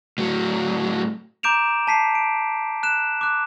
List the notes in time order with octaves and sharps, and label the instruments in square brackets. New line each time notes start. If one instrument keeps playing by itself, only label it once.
[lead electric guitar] A2 F#3
[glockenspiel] A#5 D6 G6 D7 E7 F7
A5 B6 C7
D7
F#6 E7
D6 F#6